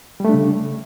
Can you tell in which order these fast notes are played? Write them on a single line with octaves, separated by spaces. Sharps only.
G3 A3 D4 C#3